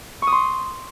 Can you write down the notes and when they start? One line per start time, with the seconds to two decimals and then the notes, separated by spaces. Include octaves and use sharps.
0.22 C#6
0.27 D#6
0.32 C6